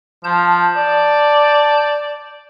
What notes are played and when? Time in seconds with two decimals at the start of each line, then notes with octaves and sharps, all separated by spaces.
0.24 F3 A5 G6
0.76 D5